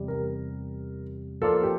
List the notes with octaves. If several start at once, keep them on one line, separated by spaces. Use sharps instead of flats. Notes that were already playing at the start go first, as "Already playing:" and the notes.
Already playing: E2 C3 G3
A#4
F3 A#3 F4 A4 A#4 D5
G4